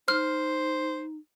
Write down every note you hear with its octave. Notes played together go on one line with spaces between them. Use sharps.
D#4 C5 F6